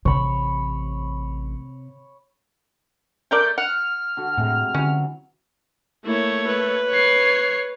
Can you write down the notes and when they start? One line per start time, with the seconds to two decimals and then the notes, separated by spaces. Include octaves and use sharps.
0.05 A1 C3 C#5 B5
3.31 A3 A#4 D5 G6
3.58 F#5 F6
4.17 D3 F#4
4.38 A2 C3 G#3
4.74 D3 E3 F#3 C#4
6.05 A3 A#3 E4 C#5
6.47 B4
6.90 C#5 C7